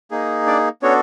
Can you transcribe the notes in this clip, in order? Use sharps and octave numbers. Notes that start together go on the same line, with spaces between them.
A#3 D#4 G#4
D4 D5
B3 C#4 D4 F#4 A4 C#5